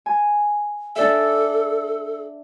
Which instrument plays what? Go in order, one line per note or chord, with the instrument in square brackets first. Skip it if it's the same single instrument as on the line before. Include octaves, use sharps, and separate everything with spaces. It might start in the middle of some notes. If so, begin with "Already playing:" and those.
[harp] G#5
[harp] D4 D5 E5 [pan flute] A4